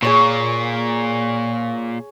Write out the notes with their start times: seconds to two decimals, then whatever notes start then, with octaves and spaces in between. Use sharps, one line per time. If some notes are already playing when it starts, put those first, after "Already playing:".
0.02 A#2 G#4 C#5 C#6